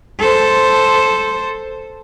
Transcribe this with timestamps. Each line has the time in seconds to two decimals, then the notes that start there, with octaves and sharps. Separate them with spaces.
0.20 A4 C5